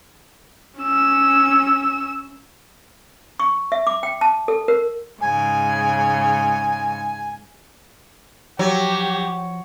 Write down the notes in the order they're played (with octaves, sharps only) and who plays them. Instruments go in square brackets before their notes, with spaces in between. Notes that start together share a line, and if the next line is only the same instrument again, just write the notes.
[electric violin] C#4 E6
[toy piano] C#6
E5
D6
G5
A5
A4
A#4
[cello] G#2 C#3 [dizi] G#5
[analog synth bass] F3 [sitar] F#3 [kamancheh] G4